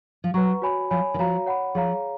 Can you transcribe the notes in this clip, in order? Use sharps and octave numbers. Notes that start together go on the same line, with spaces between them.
F3
F#3 B4 F#5 A#5 C#6
F#4 C#5 G#5 B5
F3 C#5 G#5 B5
D#3
F3 F#4 C#5 F5 A#5
C#5 F#5 B5
F3 G#4 C#5 F5 A#5